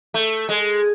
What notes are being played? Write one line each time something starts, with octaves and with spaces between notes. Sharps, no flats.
A3
G#3